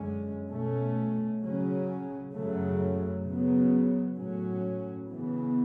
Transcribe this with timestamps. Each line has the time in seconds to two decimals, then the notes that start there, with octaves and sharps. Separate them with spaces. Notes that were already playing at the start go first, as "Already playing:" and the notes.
Already playing: F#2 D3 G#3 C#4
0.49 B2 A3 C#4
1.41 C#3 F#3 C#4
2.32 F#2 C#3 F#3 A3
3.24 C#3 F#3 B3
4.15 A2 F#3 C#4
5.07 C#3 E3 B3